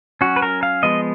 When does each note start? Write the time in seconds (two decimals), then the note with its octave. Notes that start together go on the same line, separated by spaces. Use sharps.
0.21 F#3 C#4 F#4
0.36 B4
0.42 A#4
0.63 F5
0.83 F3 G#3 B3 D#5